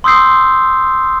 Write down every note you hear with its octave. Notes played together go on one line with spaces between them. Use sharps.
C6 D#6 E6 G6 C7